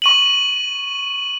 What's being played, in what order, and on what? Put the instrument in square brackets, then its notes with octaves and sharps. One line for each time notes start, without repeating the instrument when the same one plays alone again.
[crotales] C#6 D#7 F#7